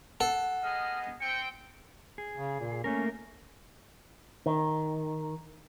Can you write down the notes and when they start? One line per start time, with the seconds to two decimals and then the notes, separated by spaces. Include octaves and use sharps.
0.21 A4 F#5
0.63 B3 G#4 D#5 F6
1.21 C4 G5 C#7
2.18 G#4
2.36 C#3
2.60 A#2
2.84 A3 A#3 C#4 A#4
4.46 D#3